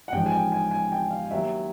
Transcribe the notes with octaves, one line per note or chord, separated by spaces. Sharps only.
F#5
A1 G#2 F3 G5
G#5
G5
G#5
G#5
G5
F5
D#2 D#3 F#3 E5